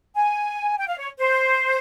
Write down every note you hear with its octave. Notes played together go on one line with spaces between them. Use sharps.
G#5
G5
F5
C#5
C5